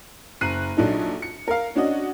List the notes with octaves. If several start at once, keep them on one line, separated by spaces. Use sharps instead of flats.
F#1 A#5 F#6 C7 D#7
A#1 F#3 D4 D#4 A4
C#7
A#4 F5
C#4 D4 F#4 D#5